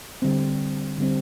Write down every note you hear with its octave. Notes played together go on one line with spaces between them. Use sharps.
D3 G3 C4
D3 G3 C4